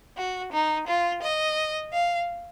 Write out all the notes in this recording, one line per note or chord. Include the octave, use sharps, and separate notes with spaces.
F#4
D#4
F4
D#5
F5